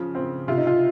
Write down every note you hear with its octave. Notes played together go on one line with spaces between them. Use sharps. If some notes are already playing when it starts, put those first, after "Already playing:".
Already playing: C#3 F3
C4
C3 F4
D#4
F4